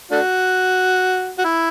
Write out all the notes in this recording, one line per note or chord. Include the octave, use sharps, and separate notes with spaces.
A3 D4 F#4
F#4
E4